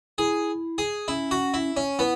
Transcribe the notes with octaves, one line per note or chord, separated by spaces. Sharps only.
E4 G#4
G#4
C#4 E4
F#4
E4
C#4
B3 E4